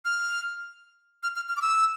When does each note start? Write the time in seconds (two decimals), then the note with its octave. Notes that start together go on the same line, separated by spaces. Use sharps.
0.05 F6
1.23 F6
1.36 F6
1.49 F6
1.57 D6
1.62 E6